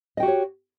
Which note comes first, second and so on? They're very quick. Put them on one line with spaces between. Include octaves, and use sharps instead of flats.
D#5 G5 F#4 G4 C#5